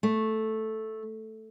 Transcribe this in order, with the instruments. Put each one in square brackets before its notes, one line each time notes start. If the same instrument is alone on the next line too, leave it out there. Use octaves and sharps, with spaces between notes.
[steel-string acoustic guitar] A3